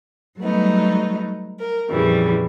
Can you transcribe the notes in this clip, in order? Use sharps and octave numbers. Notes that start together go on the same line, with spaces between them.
F#3 G3 A3 B3 D#4
A#4
F2 A#2 C#3 E3 G3